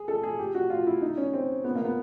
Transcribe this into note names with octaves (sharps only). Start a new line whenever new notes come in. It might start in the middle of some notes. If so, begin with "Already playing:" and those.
Already playing: G#4
A4
G#4
G4
F#4
F4
E4
D#4
C#4
C4
B3
A#3
B3